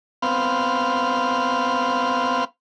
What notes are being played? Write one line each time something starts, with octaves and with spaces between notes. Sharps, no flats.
B3 C4 F5